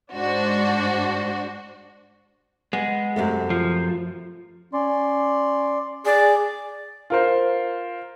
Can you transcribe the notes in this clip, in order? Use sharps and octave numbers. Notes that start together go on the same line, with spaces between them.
G#2 D4 F#4 C5
G#3 B3
F#2 C3 A3
F3
C#4 D5 C6
G#4 D5
F4 A#4 C5